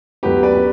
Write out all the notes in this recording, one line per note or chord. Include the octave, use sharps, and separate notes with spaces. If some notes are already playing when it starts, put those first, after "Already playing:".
D2 D3 F#3 B3 G4 B4
B4 D5